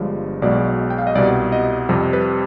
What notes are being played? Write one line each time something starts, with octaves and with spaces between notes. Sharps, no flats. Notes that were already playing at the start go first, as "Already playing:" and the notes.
Already playing: G1 G2 F3 G#3
B1 B2 G#3 D5
G5
F5
D#5
C2 B2 G3 D5
D#5
F2 C3 G3
B4